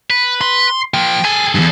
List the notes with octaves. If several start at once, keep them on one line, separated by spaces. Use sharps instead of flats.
B4
C6
F3 A#3 G5
G#4 A4 G#5
E2 G2